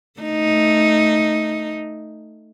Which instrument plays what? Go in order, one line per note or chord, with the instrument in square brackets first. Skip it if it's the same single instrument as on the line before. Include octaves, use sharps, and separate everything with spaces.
[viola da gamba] A3 D#4